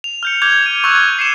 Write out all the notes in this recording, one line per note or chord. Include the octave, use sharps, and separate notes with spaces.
F7
F6 G6 C#7
D6 F6 G6 G#6 F7
D#7
C#6 E6 F#6 G#6 E7
C7 C#7 E7